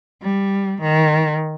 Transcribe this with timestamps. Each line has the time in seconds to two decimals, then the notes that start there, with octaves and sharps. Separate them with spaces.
0.22 G3
0.82 D#3